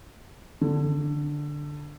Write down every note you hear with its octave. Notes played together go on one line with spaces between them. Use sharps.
D3